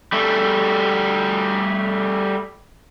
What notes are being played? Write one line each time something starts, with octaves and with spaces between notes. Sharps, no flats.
G3 A3